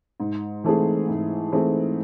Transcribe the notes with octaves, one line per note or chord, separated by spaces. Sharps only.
G#2
E3 A3 C4 G#4
G#2
E3 A3 C4 G#4